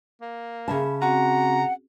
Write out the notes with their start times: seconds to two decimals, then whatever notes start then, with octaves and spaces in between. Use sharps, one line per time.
0.21 A#3
0.68 C#3 E5 A5 B5
1.02 C4 C#4 F#4 F#5 A#5